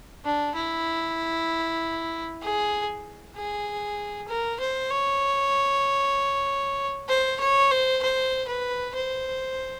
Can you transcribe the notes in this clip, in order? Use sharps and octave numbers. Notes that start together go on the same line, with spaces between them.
D4
E4
G#4
G#4
A#4
C5
C#5
C5
C#5
C5
C5
B4
C5